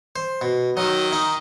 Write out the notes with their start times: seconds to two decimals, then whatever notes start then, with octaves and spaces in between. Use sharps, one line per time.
0.16 C5
0.41 B2
0.77 D#3 F#3 D#5
1.12 D#4